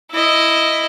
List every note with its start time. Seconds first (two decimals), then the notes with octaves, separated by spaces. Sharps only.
0.12 E4 D#5